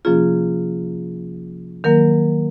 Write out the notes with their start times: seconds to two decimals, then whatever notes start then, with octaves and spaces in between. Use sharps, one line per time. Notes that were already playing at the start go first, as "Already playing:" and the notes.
0.05 C3 F3 A#3 C#4 F4 G#4
1.84 D#3 F#3 A#3 A#4